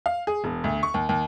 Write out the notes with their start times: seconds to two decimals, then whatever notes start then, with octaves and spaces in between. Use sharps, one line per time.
0.06 F5
0.27 G#4
0.44 E1
0.64 D2
0.83 C#6
0.94 D#2
1.09 D#2